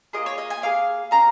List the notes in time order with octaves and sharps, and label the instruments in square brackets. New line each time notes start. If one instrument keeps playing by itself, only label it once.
[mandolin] A#3 F4 G#4 D#5
C#5
D#5
G#5
A#3 D#4 G#4 F5
C#4 G#4 A#5